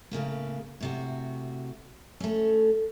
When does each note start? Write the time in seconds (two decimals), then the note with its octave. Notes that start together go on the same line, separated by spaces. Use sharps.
0.11 A2 C#3 A#3 B3
0.81 A2 C3 F#4
2.20 A3 C#4